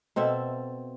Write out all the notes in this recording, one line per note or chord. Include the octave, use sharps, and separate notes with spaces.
B2 C4 A4 E5